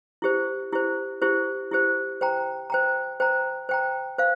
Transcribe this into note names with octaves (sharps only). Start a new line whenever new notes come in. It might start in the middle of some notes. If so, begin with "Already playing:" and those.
E4 G4 C5
E4 G4 C5
E4 G4 C5
E4 G4 C5
C5 G5 A#5
C5 G5 A#5
C5 G5 A#5
C5 G5 A#5
C5 F5